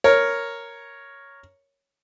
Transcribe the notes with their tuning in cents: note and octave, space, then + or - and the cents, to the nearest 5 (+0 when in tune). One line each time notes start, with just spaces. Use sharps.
A#4 +0 C#5 +0